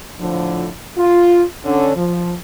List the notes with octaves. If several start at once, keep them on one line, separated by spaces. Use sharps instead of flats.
A2 D3 F3
F4
D3 C#4
F3